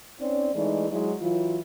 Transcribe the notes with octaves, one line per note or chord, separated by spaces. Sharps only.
C4 C#4 D#4 D5
E3 G#3 A3 D#4 D5
F#3 G#3 E4
E3 F#3 F4